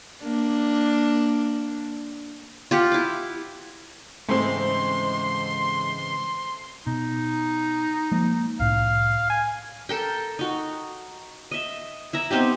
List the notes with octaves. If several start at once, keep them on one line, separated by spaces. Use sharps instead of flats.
A#3 D4
F4 G4 F#5
E4 D6
G#2 C#3 E3 G#3 A3 C4 C6
B2 D#4
F3 G#3 A#3
C2 A2 F5
G#5
A4 A#4 G5
D#4 F#4
D#5 E5
E4 E5 A#5
B3 C4 D#4 G4